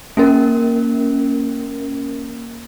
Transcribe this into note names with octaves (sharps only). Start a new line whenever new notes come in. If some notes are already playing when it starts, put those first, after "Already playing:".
A#3 C#4 A#4